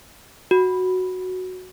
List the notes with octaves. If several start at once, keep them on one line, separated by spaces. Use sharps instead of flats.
F#4